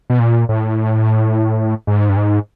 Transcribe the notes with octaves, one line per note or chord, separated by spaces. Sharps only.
B2
A#2
A2
G#2
G2
G#2